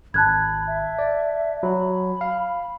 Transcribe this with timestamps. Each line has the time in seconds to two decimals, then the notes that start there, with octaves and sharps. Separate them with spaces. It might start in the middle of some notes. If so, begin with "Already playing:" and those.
0.14 G#1 A5 B5 F#6 G#6
0.67 E5
0.99 D5
1.63 F#3 B5
2.21 F5